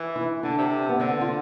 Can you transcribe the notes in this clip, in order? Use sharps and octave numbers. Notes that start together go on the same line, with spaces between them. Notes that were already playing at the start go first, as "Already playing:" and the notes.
Already playing: E3
E4
D3 D4
C3
B3
D3 C4
F4